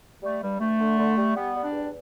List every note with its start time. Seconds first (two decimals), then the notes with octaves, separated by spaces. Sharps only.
0.23 G3 A3
0.42 G2 G3
0.60 G2 A3
0.80 D3
0.99 D3
1.17 G3
1.36 G3 B3
1.55 G3
1.64 D4
1.72 E2